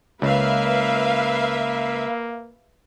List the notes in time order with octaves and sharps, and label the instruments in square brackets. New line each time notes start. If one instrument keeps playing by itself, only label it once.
[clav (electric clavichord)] C#2 [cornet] A#3 [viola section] B4 E5 F5